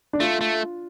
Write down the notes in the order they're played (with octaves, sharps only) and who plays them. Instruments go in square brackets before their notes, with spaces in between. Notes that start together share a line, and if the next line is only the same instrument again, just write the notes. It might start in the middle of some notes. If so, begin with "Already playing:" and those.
[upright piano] D4
[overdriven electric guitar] A3 [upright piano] F4
[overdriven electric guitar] A3